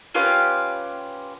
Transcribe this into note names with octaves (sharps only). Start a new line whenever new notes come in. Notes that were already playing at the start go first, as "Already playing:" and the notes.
C#4 F4 G4 B4